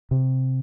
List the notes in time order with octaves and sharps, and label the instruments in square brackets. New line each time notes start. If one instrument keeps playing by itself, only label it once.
[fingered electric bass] C3